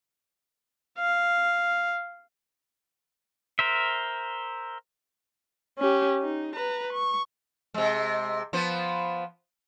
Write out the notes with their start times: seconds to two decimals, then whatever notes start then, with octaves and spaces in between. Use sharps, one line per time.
0.99 F5
3.59 A#4 C5 E5
5.79 C#4 G4
6.21 D#4
6.55 B4 A#5
6.93 C#6
7.74 C3 G#3
8.53 F3 B3 C5